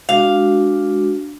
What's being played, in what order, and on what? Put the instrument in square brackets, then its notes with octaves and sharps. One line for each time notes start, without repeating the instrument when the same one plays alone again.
[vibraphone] G#3 D4 F#4 [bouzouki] F5